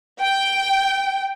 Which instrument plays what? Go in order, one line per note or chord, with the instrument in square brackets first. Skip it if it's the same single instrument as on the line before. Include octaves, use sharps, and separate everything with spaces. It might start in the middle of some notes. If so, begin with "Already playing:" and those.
[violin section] G5